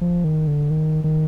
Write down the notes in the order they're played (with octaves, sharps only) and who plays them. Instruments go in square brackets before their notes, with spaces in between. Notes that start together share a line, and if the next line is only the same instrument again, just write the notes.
[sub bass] F3
D#3
D3
D#3
D#3